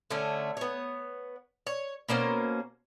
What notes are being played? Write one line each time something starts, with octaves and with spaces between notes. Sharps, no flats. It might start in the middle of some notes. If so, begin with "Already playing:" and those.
D3 A3 C#4
B3 C#5
C#5
B2 A#3 C#4 C5